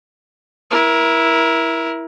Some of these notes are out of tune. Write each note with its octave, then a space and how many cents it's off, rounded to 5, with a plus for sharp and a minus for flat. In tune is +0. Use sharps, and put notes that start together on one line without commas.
E4 +0 A#4 +25